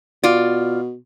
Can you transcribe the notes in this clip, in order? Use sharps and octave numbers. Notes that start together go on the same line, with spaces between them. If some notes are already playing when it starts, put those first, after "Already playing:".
B2 F4 D5